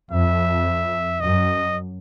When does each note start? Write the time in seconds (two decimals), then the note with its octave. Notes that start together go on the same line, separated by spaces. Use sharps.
0.12 F2 E5
1.20 F#2 D#5